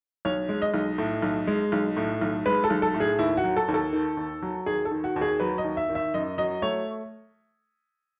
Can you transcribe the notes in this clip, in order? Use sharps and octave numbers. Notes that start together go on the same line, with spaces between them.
B1 C#5
G#3
D#5
B1
A2
B1
G#3
B1
A2
B1
G#3 B4
A4
B1
A4
A2
G#4
D#2 E4
F#4
F#3
A4
D#2
A4
D#3
D#2
F#3
D#2 G#4
A4
D#3
F#4
D#2
G#4
F#3 B4
D#5
D#2
E5
D#3
E5
F#2 D#5
F#3 D#5
A3 C#5